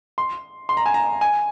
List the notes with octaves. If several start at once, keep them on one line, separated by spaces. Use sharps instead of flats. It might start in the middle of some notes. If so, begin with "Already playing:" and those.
C6
C6
A#5
G#5
A#5
G#5